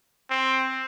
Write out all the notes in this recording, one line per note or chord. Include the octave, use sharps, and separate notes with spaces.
C4